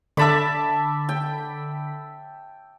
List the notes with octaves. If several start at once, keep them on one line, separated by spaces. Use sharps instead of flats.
D3 E5 A5 B5 D6 B6
G5